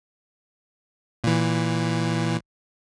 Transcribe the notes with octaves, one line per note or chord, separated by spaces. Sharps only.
A#2 E3